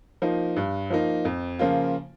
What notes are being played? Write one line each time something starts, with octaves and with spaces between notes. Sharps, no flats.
F3 A#3 D#4
G2
F3 A#3 D#4
F2
C#3 F3 A#3 F4